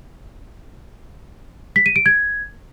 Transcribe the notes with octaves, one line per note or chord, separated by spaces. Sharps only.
B6
D#7
D7
G#6